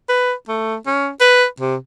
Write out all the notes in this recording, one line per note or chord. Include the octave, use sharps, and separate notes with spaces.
B4
A3
C#4
B4
C3